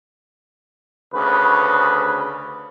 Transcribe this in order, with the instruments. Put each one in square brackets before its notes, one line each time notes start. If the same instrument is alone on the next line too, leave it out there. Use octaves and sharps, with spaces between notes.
[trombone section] D2 C#3 B4